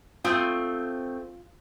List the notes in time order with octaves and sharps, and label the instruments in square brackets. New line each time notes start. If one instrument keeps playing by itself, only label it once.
[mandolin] A3 C4 D#6 [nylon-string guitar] F4